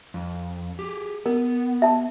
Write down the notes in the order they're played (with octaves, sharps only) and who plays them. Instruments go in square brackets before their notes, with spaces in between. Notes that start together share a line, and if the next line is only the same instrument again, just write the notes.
[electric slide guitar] F2
G4 G#4
[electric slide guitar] B3 [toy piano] A#4
[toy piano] E5 A5